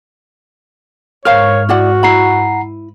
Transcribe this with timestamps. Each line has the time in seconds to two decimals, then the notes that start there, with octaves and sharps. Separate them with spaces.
1.25 G#2 A#4 C5 C#5 F5 C#6 F6
1.69 E4 F#4 D5 F#5
2.03 E4 F#5 A#5 B5 C7